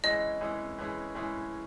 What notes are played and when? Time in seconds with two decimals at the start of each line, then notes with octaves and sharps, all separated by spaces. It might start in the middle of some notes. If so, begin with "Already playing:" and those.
0.04 E3 G#3 C#4 E4 G#4 D#5
0.41 E3 G#3 C#4 E4 G#4
0.78 E3 G#3 C#4 E4 G#4
1.15 E3 G#3 C#4 E4 G#4